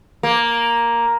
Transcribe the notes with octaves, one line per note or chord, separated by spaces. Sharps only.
A#3